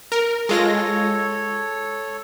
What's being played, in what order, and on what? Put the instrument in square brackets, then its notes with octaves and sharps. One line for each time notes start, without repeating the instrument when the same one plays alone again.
[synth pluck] A#4
[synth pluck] G#3 F4 A#6 [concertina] A4 C#5